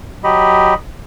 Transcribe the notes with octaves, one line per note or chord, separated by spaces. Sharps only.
F#3 G4 D#5 B5